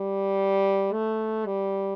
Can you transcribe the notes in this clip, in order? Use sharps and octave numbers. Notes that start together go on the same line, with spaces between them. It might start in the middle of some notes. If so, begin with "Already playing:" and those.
Already playing: G3
A3
G3